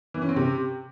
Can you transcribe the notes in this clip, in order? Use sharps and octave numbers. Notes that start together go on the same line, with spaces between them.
E3
C#4
C4
C3